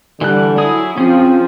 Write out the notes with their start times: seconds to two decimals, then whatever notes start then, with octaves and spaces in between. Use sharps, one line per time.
0.21 D3 E3 G3 F#6
0.58 F#3 E4 G#4 D#6
0.97 F3 C4 C#4 G#4